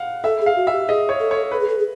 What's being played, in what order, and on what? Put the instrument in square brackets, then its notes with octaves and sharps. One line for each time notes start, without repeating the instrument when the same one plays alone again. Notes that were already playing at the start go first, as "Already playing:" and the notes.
Already playing: [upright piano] F5 F#5
[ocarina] A4 [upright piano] E5
[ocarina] G#4
[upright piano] F5
[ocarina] F#4
[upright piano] E5
[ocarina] G4
[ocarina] G#4 [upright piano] D#5
[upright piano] C#5
[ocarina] A4
[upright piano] C#5
[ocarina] A4 [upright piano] B4
[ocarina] G#4
A4
G#4